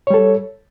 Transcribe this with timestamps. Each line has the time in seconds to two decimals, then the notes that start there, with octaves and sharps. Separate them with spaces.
0.07 C#5
0.10 G3
0.14 A4